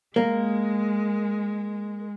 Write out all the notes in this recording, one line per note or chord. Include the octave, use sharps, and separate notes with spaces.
G#3 A#3